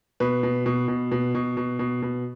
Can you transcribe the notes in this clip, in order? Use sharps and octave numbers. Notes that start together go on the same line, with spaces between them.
B2 B4
B2
B2
B2
B2
B2
B2
B2
B2